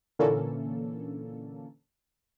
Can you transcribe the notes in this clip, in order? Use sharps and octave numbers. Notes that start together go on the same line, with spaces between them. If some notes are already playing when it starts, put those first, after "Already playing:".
A#2 D3 E3 A#3 C#4 A4